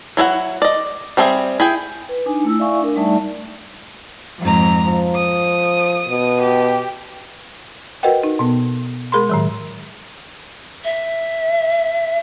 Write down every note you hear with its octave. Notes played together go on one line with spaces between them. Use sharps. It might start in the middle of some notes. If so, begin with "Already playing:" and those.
F#3 E4 A4 F#5
D5 D#5
G3 C4 D4 G#4 E5
E4 G#4 G5
B4
D4 D#4 G#5
A3 E4 E6
E4 D5 E5 F5 G#5 C#6
D4 A#4
G3 A3 D#4 D5 E5 A5
F2 G#2 A#5
F3
D#6
B2
G4
F#4 A#4 B4 D#5 F#5 G5
D#4
B2 B3
G#3 G#4 A#4 B5 C6
A2 D#3 F#3
E5